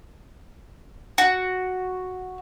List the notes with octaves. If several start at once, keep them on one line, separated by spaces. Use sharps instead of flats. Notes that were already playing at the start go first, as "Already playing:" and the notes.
F#4